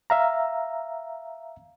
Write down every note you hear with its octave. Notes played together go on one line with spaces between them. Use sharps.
E5 F5 A#5